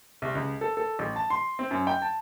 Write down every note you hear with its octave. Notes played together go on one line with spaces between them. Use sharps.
C2
C#2
A4
A4
A1
A5
C6
C4
F#2
G5
A5